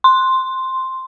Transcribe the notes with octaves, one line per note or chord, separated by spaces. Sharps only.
C6